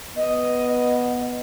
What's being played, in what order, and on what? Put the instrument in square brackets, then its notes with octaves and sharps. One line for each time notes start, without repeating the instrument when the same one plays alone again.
[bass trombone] B3 [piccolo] D#5